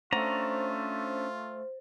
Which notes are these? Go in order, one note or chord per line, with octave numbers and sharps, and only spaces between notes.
A3 C#4 D4 F4 C5 A#5